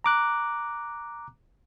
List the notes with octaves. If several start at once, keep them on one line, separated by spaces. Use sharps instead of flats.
A#5 D6 F#6